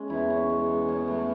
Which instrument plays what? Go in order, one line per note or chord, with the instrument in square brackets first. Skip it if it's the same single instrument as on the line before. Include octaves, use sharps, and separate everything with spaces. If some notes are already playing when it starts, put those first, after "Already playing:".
Already playing: [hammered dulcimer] G#3 C#4
[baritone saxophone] E2 [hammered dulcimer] E4
[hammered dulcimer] C#4
G#3
G#3
C#4
A3